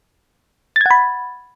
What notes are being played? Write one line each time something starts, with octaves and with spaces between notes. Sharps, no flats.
F#5 B5 G#6 A6